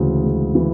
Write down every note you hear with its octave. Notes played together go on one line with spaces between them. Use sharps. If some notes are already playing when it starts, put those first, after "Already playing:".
Already playing: D2 C#3 E3 G#3
G#3
E3